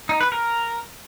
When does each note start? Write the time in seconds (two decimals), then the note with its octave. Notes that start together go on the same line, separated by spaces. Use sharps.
0.09 D#4
0.21 B4
0.32 A#4